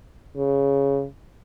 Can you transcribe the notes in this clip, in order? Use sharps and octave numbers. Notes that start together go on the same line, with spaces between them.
C#3